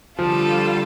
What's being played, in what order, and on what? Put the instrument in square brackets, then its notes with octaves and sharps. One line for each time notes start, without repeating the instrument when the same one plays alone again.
[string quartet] D3 G3 F4 A4 [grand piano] F3